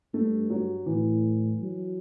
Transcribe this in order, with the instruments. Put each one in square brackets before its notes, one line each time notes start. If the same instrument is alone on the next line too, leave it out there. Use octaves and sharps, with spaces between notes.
[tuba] G2 [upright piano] A3
[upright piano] F#3
[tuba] A2 [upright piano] E3
[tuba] F#3